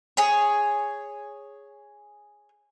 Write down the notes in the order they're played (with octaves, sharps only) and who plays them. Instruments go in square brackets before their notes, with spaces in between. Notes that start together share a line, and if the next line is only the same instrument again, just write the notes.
[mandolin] G#4 C#5